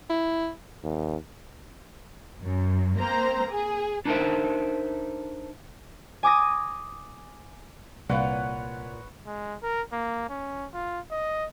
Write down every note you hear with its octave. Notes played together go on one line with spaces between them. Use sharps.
E4
D#2
F#2
A#3 C4 C5 A#5
G#4
D4 D#4 A4 A#4 C5 E5
G#5 D6 D#6 A#6
C2 A#2 B4 C#5 D5 F5 F#5
G#3
A#4
A#3
C#4
F4
D#5